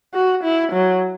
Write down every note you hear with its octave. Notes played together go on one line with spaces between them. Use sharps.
F#4
E4
F#3